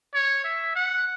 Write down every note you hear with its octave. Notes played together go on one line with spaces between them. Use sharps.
C#5
E5
F#5